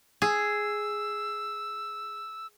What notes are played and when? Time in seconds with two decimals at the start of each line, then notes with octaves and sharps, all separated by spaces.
0.22 G#4 E6